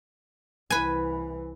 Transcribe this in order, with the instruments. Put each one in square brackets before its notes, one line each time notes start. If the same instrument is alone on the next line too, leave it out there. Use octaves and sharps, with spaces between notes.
[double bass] C2 E3 [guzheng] B4 G#5